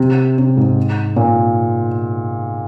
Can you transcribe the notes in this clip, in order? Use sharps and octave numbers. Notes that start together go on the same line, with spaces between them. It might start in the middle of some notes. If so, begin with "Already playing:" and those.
Already playing: C3
C3
G#2
A#2